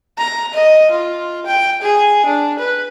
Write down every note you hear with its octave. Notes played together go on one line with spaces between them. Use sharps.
A#5
D#5
F4
G5
G#4
D4
B4